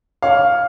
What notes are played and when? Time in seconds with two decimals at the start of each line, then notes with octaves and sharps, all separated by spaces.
0.22 C#5 F5